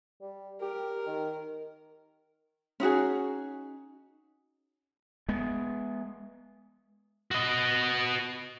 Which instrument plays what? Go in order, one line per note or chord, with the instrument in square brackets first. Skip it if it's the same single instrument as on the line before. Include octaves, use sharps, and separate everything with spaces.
[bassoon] G3
[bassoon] G4 [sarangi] A#4
[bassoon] D#3
[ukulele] C#4 D#4 F#4 G#4
[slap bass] G#3 B3
[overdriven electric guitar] F#4 D#5